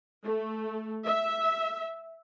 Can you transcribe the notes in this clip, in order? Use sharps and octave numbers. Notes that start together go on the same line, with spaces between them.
A3
E5